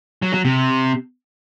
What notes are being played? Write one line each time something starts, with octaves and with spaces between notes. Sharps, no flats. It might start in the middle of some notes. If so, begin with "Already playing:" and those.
F#3
F#3
C3